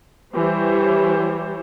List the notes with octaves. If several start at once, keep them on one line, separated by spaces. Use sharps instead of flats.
E3 G3 G4 C5 C#5